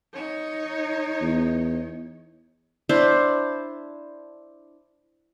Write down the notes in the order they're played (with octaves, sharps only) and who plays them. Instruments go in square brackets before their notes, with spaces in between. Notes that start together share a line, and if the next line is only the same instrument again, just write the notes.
[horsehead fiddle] D#4 C#5
[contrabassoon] E2
[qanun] D4 E4 C5